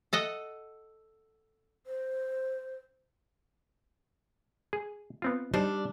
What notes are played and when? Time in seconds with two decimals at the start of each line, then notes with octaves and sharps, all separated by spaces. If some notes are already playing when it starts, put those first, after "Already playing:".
0.13 A4 D#5 F#5
1.87 C5
4.73 G#4
5.22 B3 C4 F4
5.54 G3 D4 D#4 C5 D5